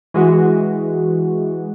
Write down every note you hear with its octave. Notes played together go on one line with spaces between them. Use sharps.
E3 G#3 F#4